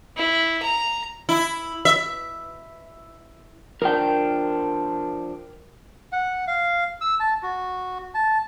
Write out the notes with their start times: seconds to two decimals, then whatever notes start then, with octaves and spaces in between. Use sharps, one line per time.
0.17 E4
0.63 A#5
1.29 E4
1.85 E5
3.82 F3 D4 A#4 G5
6.12 F#5
6.48 F5
7.01 E6
7.20 A5
7.43 F#4
8.14 A5